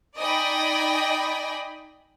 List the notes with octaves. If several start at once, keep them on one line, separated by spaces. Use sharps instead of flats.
D#4 D5 D#5 G5 G#5 B5